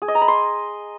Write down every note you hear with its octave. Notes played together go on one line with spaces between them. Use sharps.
G#4
D#5
A#5
B5
C6